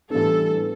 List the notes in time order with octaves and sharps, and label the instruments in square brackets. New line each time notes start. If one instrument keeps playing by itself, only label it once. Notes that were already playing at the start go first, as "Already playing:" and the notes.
[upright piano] A2 E3 G3 B3 D4 [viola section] A4